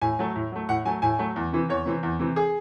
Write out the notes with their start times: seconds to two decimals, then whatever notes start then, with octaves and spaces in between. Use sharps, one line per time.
0.02 A2 G#5
0.19 F#3 A3
0.36 A2
0.52 F#3 A3
0.69 A2 F#5
0.85 F#3 A3 G#5
1.02 A2 G#5
1.19 F#3 A3
1.36 E2
1.52 C3 E3 C4
1.69 E2 C#5
1.86 C3 E3 C4
2.03 E2
2.19 C3 E3 C4
2.36 G#4